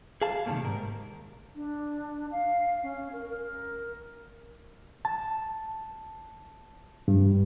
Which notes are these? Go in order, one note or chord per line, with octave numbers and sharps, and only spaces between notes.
G#4 F5 A5
C3 D#3 F3 G3 A3 A#3
G#2 A#4
D4
F5
C#4
A#4
A#4
A5
G2